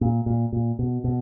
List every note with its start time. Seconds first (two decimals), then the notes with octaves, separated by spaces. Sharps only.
0.01 A#2
0.26 A#2
0.53 A#2
0.79 B2
1.04 B2